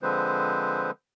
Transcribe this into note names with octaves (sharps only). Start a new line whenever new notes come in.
D3 F3 G#3 C4 B4 C5